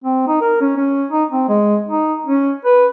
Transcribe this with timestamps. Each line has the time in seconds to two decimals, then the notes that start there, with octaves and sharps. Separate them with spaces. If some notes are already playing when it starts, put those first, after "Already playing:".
0.04 C4
0.28 D#4
0.41 A#4
0.61 C#4
0.77 C#4
1.11 D#4
1.31 C4
1.48 G#3
1.89 D#4
2.26 C#4
2.65 B4